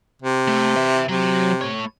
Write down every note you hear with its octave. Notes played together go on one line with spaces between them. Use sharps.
C3
A3
B4 E5
C3 F#3
A2 C#5